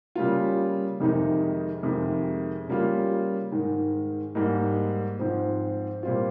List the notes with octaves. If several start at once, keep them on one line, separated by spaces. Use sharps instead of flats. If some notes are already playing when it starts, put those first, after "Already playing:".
C#3 G3 A#3 F4
F2 C3 D#3 G#3 D#4
F2 C3 D#3 G#3
C#3 G3 A#3 F4
G#2 D#3 G#3
G#2 G3 A#3 D#4
G#2 F3 C4
A#2 G3 C4 F4